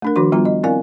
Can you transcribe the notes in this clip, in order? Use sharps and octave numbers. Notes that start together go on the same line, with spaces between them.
A3 D4 A#4
D#3 F3 D4 F#4 C6
G3 B3 F4 A#5
D#5
C4 E4 A#4 D5 F5 G#5